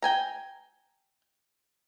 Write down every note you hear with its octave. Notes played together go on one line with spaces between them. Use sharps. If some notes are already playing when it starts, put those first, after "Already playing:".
G5 G#5 A#5